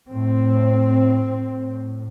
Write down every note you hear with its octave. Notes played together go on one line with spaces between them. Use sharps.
A2 C4
A2